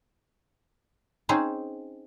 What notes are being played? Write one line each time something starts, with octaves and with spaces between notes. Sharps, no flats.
C4 C#4 D#4 G#4 C5